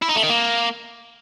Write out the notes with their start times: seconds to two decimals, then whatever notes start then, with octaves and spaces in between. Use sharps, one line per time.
0.02 E4
0.09 D#4
0.16 A3
0.23 D#3
0.29 A#3